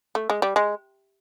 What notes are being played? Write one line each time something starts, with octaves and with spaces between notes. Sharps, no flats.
A3
G#3
G3
G#3